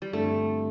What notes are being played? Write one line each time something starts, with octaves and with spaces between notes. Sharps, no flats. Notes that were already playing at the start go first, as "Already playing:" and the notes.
G3
G2 D3 F3 A3 C4 F4